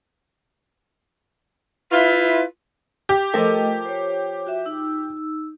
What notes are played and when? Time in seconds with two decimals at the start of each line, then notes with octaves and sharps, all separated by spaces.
1.91 E4 F4 B4
3.09 G4
3.34 F3 A3 A4 A#4 D#5
3.86 C5 C#5
4.47 F#4 E5
4.66 D#4 E6